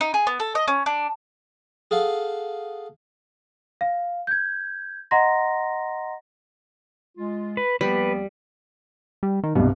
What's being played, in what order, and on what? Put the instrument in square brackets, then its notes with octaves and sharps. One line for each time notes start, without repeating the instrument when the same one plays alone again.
[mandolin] D#4
G#4
B3
A4
D#5
C#4
D4
[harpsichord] G#4 A4 F5 F#5
[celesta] F5
G6 G#6
D#5 F#5 A#5 C6 A#6
[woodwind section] G#3 F4
[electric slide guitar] B4
[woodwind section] D#2 F3 B3 [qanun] G3 [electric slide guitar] B4
[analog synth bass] G3
D#3
[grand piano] C2 G2 [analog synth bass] B2